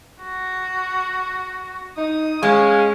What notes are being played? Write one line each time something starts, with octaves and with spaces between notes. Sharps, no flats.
F#4
D#4 D#6
G#3 C#4 F5